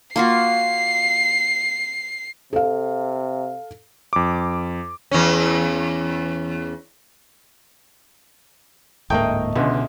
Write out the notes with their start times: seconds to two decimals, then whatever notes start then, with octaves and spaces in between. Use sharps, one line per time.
0.16 A#3 F4 F#4 C7
2.53 C3 A4 F5
4.13 F2 D6
5.11 E2 C#4
9.10 D1 G#2 A3 A#3 A#4 D#5 G5
9.56 C#2 B2 D3 G#4 C5 E5